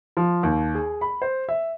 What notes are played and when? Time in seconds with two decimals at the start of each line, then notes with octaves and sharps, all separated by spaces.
0.17 F3
0.43 D#2
0.75 G#4
1.01 B5
1.22 C5
1.49 E5